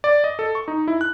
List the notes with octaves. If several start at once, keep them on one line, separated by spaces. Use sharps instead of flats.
D5
D#5
A4
C#6
D#4
E4
F#6